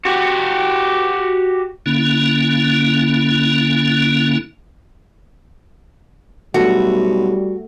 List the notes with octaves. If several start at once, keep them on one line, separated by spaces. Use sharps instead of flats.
F#4 G4
D3 A#3 C#4 E4
B1 G3 A3 F#4